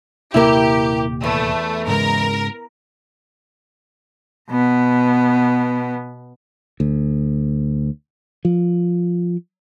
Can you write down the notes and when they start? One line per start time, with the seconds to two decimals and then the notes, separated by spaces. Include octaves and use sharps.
0.34 D#1 C3 A#3 E4 G4 A#4
1.24 E2 A3
1.88 G#2 C#3 G#3 A#4
4.50 B2 B3
6.80 D2
8.45 F3